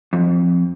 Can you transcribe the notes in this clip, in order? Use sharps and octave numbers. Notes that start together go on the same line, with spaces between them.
F2